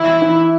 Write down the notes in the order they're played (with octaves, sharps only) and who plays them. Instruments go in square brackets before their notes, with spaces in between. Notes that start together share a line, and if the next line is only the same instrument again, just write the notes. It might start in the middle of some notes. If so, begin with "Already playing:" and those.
Already playing: [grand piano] E3 [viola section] E4
[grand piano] E3